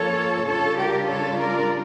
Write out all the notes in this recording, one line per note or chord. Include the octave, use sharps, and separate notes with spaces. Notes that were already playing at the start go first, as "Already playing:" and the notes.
Already playing: F3 A#3 C#4 F4 A4 C#5
C#3 G3 D4 F4 A4 C#5
G4 A#4
A4 C#5
A#4 D5